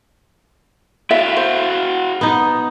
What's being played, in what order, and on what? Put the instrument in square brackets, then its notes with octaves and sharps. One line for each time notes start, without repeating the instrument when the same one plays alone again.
[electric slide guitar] E4 F#4 F5 [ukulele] E5
[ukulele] C5
[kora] B3 D#4